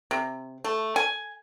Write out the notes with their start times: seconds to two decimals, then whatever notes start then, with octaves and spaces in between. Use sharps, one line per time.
0.11 C3
0.64 A3
0.96 G#5